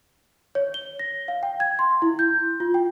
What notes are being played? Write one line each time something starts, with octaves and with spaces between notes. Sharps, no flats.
C#5
G7
A#6
F5
G5
G#6
C6
E4
G6
F4
G5